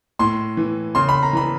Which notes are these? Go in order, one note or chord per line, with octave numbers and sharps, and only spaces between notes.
A2 C6
E3
C#3 C6
B5
A#5
E3 B5